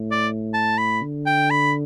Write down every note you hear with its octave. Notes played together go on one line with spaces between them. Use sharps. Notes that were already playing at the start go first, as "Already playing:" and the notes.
Already playing: A2
D5
A5
B5
D3
G5
B5